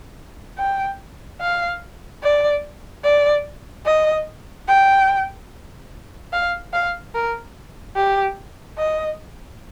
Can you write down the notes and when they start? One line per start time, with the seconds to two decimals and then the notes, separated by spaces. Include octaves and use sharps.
0.58 G5
1.41 F5
2.23 D5
3.04 D5
3.86 D#5
4.68 G5
6.33 F5
6.73 F5
7.14 A#4
7.96 G4
8.78 D#5